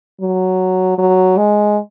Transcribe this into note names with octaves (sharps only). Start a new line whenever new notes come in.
F#3
F#3
G#3